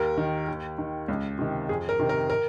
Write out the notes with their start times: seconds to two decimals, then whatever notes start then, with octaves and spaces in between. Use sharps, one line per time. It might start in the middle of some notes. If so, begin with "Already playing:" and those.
Already playing: D#2 A#4
0.17 D#3
0.48 D#2
0.78 D#3
1.08 C#2
1.39 C3 D#3
1.69 F2 G#4
1.89 A#4
2.00 C3 D#3
2.09 A#4
2.30 A#4